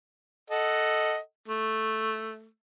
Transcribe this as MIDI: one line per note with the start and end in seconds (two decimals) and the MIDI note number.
0.50 1.17 69
0.50 1.17 75
0.50 1.17 78
1.48 2.47 57